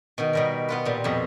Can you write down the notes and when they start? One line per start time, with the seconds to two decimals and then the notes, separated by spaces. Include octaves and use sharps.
0.18 B2 D#3
0.33 B2 G3 A#4
0.68 B3 F4 B4
0.85 A#2 G3
1.04 F2 B2